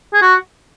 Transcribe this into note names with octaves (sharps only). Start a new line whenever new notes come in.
G#4
F#4